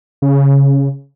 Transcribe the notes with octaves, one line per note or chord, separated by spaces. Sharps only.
C#3